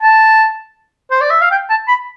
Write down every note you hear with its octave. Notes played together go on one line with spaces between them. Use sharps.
A5
C5
D5
E5
F5
G5
A5
B5